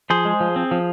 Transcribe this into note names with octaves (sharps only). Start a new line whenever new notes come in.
F3 G#4 C5
G#3
F3
C4
F3